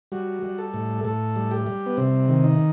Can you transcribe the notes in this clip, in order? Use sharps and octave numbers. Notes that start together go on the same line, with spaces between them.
G3 F#4
G3
A4
A2
A2 A4
G3
G4
G3
B3
C3 C4
D#3
D#4